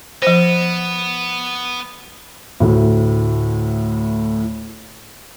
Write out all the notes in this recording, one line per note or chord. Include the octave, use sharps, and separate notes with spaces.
F3 B3 C5
D2 A2